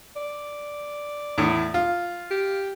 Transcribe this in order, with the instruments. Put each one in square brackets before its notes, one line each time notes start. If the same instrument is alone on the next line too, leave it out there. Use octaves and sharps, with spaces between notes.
[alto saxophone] D5
[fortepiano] E2 A2
F4
[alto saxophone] G4